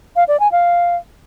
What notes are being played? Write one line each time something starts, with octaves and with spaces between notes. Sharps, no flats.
F5
D5
G#5
F5